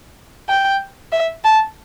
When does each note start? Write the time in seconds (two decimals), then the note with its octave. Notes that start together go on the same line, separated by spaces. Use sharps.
0.49 G5
1.12 E5
1.44 A5